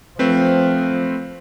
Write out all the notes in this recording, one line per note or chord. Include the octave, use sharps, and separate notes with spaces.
F3 A3 C4 B4